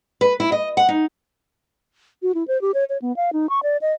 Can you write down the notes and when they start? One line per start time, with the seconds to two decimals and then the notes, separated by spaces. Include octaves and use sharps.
0.21 B4
0.40 E4
0.52 D#5
0.77 F#5
0.89 D#4
2.22 F#4
2.35 E4
2.48 C5
2.61 G4
2.74 C#5
2.89 C#5
3.02 B3
3.17 F5
3.33 D#4
3.49 C#6
3.63 D5
3.82 D#5